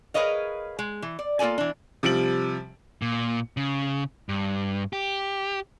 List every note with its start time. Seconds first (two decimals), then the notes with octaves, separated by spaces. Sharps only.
0.14 G#4 A#4 B4 C#5 D#5 F5
0.79 G#3
1.02 E3
1.19 D5
1.39 A#3 F4 A4 D5 G#5
1.58 E3 D4
2.03 C3 F3 G3 D7 F#7
3.02 A#2
3.57 C#3
4.29 G2
4.93 G4